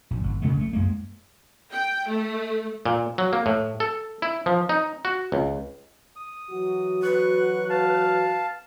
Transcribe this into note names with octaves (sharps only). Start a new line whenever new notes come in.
A#1
G1
A#2 C#3 G#3 A3
A#1 A3
F#2 G#3 A#3
G5
A3
A#2
F#3
A#3
A2
A4
E4
F3
D#4
F#4
C#2
D#6
E3 F#3 F#4
B4 C#6 F#6
F5 A5